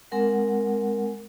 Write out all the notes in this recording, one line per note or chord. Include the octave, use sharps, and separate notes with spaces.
G#3 C4 A#4 F#5